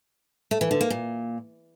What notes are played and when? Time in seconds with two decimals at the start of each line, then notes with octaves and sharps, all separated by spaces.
0.51 A3
0.61 E3
0.71 D3
0.81 A#3
0.90 A#2